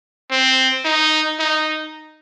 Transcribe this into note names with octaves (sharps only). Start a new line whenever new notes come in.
C4
D#4
D#4